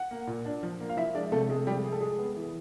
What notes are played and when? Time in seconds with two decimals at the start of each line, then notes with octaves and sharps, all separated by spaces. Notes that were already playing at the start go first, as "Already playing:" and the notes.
Already playing: F#5
0.11 A#3
0.27 A#2
0.46 D4
0.63 F3
0.80 A#3
0.89 F5
0.97 F3 E4 E5
1.14 G#3 D4 D5
1.32 C3 A3 A4
1.49 C3 G#3 G#4
1.67 F3 G3 G4
1.84 G#3 G#4
1.92 A4
2.01 G#3 G#4
2.18 B3
2.36 E3